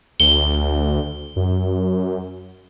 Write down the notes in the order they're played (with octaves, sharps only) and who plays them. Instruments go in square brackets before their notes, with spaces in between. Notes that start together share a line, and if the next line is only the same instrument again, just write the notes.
[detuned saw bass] D2 [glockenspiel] G7
[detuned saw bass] F#2